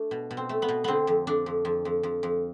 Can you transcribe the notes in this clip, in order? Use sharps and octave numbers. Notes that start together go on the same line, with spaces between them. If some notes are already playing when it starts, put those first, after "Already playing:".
Already playing: A3 D4
B2
B2
C4
A3
B3
B2
D3 B3 C4
F2
F2 D4
F2
F2
F2
F2
F2